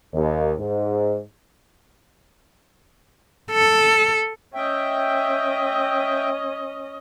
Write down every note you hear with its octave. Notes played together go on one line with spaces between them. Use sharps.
D#2
G#2
A4
C#4 D#5 E5 G5